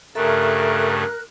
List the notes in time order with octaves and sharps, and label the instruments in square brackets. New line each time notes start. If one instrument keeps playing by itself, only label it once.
[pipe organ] G2 C#3 A3 [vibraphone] A4 E5 A#5 [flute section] A#4 F#6